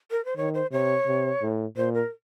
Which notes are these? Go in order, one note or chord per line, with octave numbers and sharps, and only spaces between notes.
A#4
C5
D#3 C#5
C5
C3 C#5
C3
A2
A#2 C5
A#4